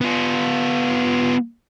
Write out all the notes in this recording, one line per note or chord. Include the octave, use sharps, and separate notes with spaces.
B3 F4